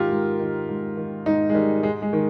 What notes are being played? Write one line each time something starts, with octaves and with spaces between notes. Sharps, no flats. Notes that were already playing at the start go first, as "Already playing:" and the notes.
Already playing: G#2 D#3 F4 G4 A#4
G#2
D#3
G#2
D#3
G#2 D#4
G#3
D#3 G3
G#2 G#3
G#3
D#3